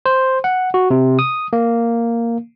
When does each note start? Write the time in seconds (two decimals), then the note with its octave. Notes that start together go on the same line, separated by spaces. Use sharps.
0.06 C5
0.44 F#5
0.74 F#4
0.90 C3
1.19 D#6
1.53 A#3